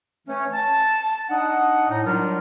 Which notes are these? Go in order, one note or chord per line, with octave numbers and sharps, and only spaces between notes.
E3 A3 C#4
A5
D4 D#4 D#5 F#5
A2 D#4
F#3 G3 D4 F4 A#4 F6